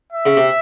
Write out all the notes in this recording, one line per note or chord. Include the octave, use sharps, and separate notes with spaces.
E5
C#3
C3